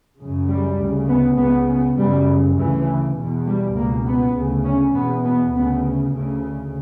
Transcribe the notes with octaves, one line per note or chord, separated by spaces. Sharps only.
F#2 C#3
G3
D2 C#3
B3
C#2 C#3 B3
B3
F#2 C#3 G3
D2 C#3 E3
E2 B2
G3
C#2 B2 A#3
B3
D2 C#3
C#4
E2 B2 B3
B3
D2 C#3 B3
D2 C#3